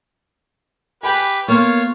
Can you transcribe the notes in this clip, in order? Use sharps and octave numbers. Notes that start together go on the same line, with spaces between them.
G4 B4 G5 G#5 B5
A#3 B3 F4 C#5